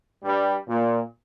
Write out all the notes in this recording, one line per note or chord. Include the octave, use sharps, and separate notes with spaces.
G2 G3
A#2